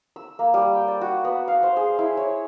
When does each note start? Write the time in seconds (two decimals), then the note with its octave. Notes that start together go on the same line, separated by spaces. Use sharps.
0.16 E6
0.39 A#3
0.54 G3
0.73 G5
0.88 D5
1.01 F#4
1.25 B3
1.48 F5
1.63 C5
1.77 G#4
1.99 E4
2.17 C#5